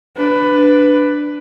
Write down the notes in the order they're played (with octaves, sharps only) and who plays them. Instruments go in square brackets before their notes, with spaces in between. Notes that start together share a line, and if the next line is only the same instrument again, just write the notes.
[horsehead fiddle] D4 B4